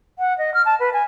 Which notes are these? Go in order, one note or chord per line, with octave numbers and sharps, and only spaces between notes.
F#5
D#5
F6
A5
B4
G#5